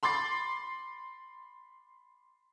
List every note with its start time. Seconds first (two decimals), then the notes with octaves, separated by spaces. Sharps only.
0.03 B5 C6 D6 A6 C7